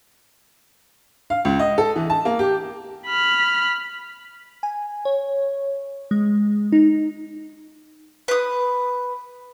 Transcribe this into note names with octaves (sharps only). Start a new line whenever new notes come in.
F5
C#2
D#5
A4
E3
A5
A#3
G4
B5 F6
G#5
C#5
G#3
D#4
B4 D#6